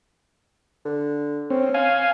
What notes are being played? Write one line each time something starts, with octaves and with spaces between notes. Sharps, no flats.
D3
C4 C#4
F5 G#5